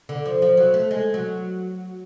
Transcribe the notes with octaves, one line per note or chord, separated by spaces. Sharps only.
D3
F3
F3
F#3
A3
G#3
F#3